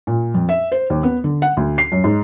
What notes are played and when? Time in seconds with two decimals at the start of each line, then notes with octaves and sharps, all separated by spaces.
0.07 A#2
0.34 F2
0.49 E5
0.72 C5
0.90 D#2
1.03 B3
1.24 D3
1.42 F#5
1.57 D2
1.78 C7
1.92 F#2
2.04 G#2